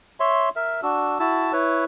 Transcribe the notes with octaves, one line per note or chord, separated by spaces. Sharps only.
C#5 E5 C6
A#4 E5
D4 F#4 E6
E4 F#4 A5 E6
E4 B4 C#5